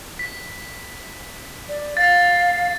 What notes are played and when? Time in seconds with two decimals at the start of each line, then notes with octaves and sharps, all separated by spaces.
0.19 B6
1.69 D5
1.97 F5 A6